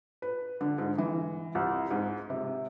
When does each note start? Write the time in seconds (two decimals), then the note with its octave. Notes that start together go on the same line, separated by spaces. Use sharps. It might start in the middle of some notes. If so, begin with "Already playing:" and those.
0.22 B4
0.61 D3
0.78 G#2
0.98 E3
1.55 C2
1.91 G#2
2.30 C3